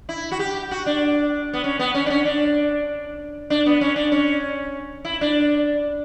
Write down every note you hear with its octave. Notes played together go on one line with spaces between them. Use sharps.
E4
F#4
G4
F#4
D4
B3
C#4
B3
C#4
D4
C#4
D4
D4
B3
C#4
D4
C#4
E4
D4